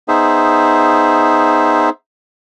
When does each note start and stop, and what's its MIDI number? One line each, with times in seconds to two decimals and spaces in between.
0.08 1.90 59
0.08 1.90 63
0.08 1.90 68
0.08 1.90 72
0.08 1.90 76